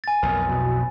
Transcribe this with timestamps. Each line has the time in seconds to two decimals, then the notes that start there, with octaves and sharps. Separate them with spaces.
0.04 G#5 A6
0.23 B1 F2 A#4
0.49 B2